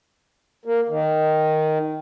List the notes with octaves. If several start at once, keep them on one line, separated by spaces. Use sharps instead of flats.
A#3
D#3